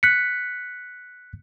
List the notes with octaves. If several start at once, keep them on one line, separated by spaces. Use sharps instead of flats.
F#6 B6 C#7